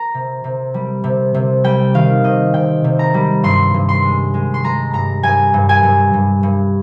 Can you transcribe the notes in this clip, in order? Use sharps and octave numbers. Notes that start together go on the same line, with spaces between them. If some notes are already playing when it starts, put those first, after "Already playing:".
Already playing: A#5
C3
C3
G3
C3
C3
G3 G5
D#3 F5
C3 D#5
C3 G5
C3
A#5
G3
G2 C6
G2
C6
G#3
G#3
C6
G#3 A#5
G2 A#5
G2 G#5
G2
G#5
G2
G2
G2